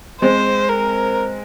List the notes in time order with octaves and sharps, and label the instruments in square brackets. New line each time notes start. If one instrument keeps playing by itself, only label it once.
[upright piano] G#3 C4 [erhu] C5
[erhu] A#4